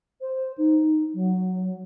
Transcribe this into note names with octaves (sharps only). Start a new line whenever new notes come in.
C5
D#4
F#3